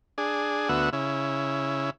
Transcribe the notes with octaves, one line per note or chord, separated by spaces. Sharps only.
D4 G#4
D2 B3 F#4 E5
C#3 E4